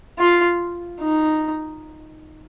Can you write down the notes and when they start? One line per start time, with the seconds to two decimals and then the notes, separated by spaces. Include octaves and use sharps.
0.19 F4
1.01 D#4